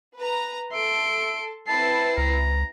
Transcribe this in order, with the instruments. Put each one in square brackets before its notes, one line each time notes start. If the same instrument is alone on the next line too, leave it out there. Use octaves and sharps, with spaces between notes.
[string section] B4 A#5
[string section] A4 [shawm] E5 [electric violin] C6 D7
[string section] C4 E4 B4 [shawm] A5 [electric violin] C7
[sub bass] C#2 [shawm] A#5